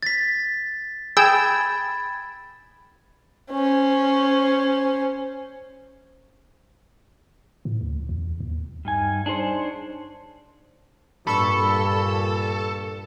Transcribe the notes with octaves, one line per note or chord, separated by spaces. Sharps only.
A6 B6
G#4 G5 B5 E6 G#6 A6
C#4 C5
A2
D2
E2
D#2
G2 D#4 G#5
D4 D#4 G#4 C5 C#5
G2 A#2 A4 B5 C#6 E6